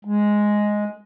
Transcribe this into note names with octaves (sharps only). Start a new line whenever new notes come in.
G#3